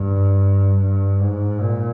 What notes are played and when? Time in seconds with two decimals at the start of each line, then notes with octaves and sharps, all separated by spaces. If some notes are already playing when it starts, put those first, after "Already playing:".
Already playing: G2
0.79 G2
1.20 G#2
1.60 A#2